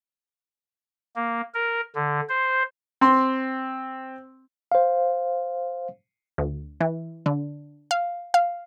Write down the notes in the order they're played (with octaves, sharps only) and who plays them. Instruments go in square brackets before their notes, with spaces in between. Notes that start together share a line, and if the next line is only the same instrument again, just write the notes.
[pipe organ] A#3
A#4
D3
C5
[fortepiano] C4 C6
[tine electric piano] C5 F5
[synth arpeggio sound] D2
E3
D3
F5
F5